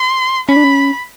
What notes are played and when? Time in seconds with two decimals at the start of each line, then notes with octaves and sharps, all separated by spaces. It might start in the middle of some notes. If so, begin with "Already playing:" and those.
Already playing: C6
0.49 C#4 B5
0.56 D4
0.64 C#4